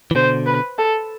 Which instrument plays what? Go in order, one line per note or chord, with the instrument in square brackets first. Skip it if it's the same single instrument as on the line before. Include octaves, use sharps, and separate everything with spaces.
[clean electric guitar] E3
[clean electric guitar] B2 D3 [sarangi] C5
[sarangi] B4
A4